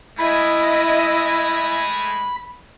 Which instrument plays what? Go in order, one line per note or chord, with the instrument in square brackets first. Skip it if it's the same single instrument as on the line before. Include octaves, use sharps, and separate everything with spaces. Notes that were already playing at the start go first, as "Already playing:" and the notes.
[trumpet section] G#3 A3 G#5 [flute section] E4 D#5 [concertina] B5